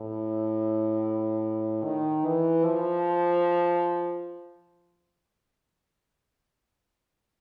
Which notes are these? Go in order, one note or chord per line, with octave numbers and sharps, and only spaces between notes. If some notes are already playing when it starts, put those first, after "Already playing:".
Already playing: A2
D#3
E3
F3